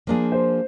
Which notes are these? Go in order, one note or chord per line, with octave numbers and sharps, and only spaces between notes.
F3 A#3 D4 G#4
C5